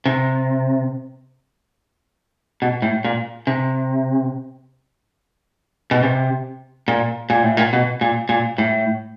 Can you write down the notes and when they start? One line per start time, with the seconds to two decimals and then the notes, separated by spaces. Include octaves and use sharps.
0.06 C3
2.62 B2
2.82 A2
3.04 A#2
3.47 C3
5.91 B2
6.03 C3
6.88 A#2
7.30 A#2
7.43 A2
7.57 A#2
7.73 B2
8.01 A#2
8.29 A#2
8.58 A2